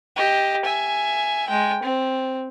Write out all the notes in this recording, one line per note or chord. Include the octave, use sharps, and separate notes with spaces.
G4 D#5
E5 G#5
G#3 G5
C4